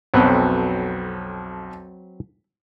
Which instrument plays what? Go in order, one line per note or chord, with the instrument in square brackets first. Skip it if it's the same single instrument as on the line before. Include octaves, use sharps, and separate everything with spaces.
[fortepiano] B1 F2 [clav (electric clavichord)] F#3 C4 B4